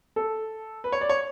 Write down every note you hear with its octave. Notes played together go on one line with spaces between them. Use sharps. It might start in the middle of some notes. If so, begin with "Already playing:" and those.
A4
B4
C#5
D5
C#5